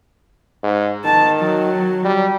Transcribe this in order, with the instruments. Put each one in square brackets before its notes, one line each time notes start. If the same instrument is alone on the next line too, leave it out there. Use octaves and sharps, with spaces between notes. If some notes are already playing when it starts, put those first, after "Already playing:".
[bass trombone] G#2
[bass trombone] D#3 [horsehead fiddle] A5
[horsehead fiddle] F#3
[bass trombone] G3